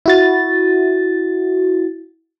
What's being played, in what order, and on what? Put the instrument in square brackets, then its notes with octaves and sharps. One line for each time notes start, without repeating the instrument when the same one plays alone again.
[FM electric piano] E4 F#4 A6